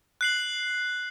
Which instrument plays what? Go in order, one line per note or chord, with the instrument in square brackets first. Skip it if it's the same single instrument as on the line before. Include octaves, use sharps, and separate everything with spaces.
[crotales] F#6 C7 F#7